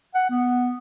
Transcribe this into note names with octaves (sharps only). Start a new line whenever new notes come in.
F#5
B3